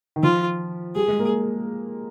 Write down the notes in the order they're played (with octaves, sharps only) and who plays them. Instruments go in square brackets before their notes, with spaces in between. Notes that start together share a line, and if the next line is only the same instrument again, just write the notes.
[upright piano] D#3
[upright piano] F3 [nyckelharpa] F4
[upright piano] G3 [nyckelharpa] G#4
[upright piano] G#3
A#3